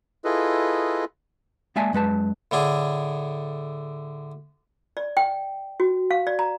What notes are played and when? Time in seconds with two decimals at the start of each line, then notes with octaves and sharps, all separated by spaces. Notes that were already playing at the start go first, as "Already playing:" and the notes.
0.24 E4 F4 G#4 A4 B4 D#5
1.76 G#3 A#3 D5 E5 G#5 A5
1.93 F#2 G#3 B4 A5
2.51 A2 D3 D4 G#4
4.97 D5
5.17 G5
5.80 F#4
6.11 F5
6.27 D5
6.39 A#5